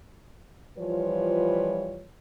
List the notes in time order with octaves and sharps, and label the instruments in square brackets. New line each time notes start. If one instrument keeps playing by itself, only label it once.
[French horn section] E3 F3 G3 F4 B4 C#5